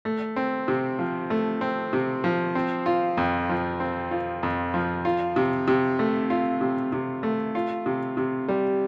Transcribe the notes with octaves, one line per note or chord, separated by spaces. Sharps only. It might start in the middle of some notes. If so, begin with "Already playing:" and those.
A3
C4
C3
F3
A3
C4
C3
F3
C4
F4
F2
F3
C4
F4
F2
F3
F4
C3
C3
A3
F4
C3
C3
A3
F4
C3
C3
G3